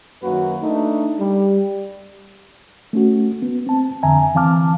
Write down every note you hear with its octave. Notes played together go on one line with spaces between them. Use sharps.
F#2 D#3 A#3 F#4 B4
A3 D4 D#4
G3
A3 C#4 F#4
B3
C4 A5
F2 D3 E5 G#5 A#5
E3 C4 F5 A5 D6 F6